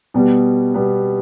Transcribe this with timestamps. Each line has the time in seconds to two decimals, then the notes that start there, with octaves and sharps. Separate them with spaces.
0.14 B2 G3 B3
0.74 B2 G3 B3